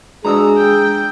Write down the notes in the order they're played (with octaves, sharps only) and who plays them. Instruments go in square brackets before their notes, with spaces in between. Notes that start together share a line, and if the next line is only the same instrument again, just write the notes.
[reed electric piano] G#3 D4 [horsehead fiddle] F#4 [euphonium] G#4 [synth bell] A#5 D#6 E6
[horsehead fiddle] G5